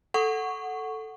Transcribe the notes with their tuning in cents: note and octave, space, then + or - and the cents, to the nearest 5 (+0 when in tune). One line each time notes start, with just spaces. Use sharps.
A4 +0 F#5 +0 C#6 +0